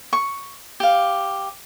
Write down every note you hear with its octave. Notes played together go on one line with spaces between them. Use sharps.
C#6
G4 F5